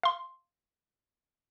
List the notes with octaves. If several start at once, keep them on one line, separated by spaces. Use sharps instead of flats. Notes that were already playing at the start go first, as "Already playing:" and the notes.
F5 C6